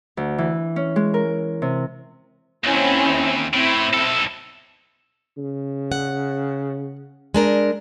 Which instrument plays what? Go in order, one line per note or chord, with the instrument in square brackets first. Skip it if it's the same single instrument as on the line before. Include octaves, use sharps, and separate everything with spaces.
[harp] D2
E3
C#4
G#3
A#4
C3
[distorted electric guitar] D#2 [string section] C4 C#4 E4
[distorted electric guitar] A2 [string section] C4 E4
[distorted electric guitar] B1 A4
[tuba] C#3
[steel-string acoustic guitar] F#5
G#3 D4 A#4